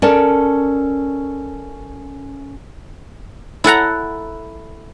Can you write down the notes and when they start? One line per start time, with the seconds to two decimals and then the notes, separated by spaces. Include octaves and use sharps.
0.02 C#4 A4 A#4 D5 A5
3.64 E4 A4 F#5 A#5